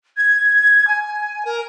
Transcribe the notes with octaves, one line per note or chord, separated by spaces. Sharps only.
G#6
G#5
A#4